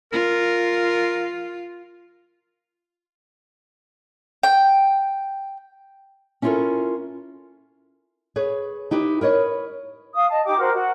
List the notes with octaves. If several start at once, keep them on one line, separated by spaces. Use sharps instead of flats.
F4 A#4
G5
C#4 E4 F4 G4 A4 A#4
G#4 B4 C#5
D#4 E4 G4 B4
A#4 B4 C#5 D#5
F5 D#6
D#5 A5
D#4 G4 G5 D6
F#4 A#4 C5
F#4